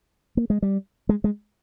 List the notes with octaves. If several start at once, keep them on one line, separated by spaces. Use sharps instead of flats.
A#3
G#3
G3
G#3
G#3